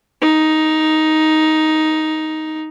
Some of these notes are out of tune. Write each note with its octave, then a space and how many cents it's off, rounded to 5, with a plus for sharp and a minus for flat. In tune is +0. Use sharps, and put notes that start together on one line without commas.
D#4 +5